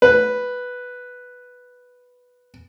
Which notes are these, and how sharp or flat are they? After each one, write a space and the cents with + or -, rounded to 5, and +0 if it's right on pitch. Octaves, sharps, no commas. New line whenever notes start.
B4 +0